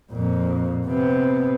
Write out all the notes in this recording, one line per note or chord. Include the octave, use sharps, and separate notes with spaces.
F2 A#2
C3 B3